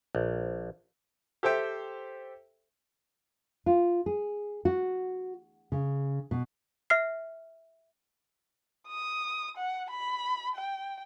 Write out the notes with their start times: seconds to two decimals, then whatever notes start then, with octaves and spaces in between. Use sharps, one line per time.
0.15 A#1
1.43 G4 A4 C5 E5 G5
3.66 F4
4.06 G#4
4.65 F#4
5.72 C#3
6.31 B2
6.90 E5 F6 C7
8.87 D#6
9.57 F#5
9.90 B5
10.55 G5